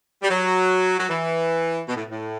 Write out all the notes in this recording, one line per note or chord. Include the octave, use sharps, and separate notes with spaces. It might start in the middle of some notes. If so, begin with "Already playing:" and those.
G3
F#3
F#3
E3
B2
A2
A2